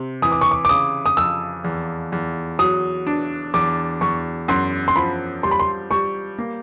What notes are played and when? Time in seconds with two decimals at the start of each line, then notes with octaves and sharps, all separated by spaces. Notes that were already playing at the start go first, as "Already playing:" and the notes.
Already playing: C3
0.22 E3 D#6
0.32 D6
0.41 C#6
0.51 D6
0.65 D6
0.69 C#3 D#6
1.06 D#6
1.17 F2 E6
1.64 E2
2.12 E2
2.59 F#3 D#6
3.07 D4
3.54 E2 D6
4.01 E2 C#6
4.48 F#2 C6
4.88 C6
4.96 F3 B5
5.43 G3 C6
5.51 B5
5.60 C6
5.91 G3 C#6
6.39 A#3